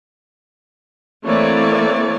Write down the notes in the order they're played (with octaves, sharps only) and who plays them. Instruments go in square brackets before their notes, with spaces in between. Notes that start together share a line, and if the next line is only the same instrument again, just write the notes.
[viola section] E3 A3 A#3 C4 C#5 D5